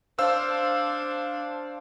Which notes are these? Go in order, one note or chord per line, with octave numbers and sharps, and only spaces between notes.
D4 C5 F5 E6